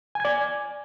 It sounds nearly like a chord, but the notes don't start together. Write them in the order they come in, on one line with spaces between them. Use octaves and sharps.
G#5 G#6 D5